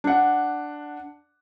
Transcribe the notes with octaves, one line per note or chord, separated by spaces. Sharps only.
D4 F#5